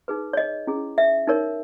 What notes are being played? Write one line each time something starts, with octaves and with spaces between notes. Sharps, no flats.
D#4 G#4 B4
C#5
D#5
C#4 E4 G#4
E5
D#4 A#4 C#5